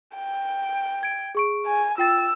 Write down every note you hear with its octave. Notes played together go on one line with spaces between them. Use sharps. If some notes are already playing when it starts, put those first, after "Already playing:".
G5
G#6 D7
G#4 C#6 D7
G#5
F4 G5 E6 A6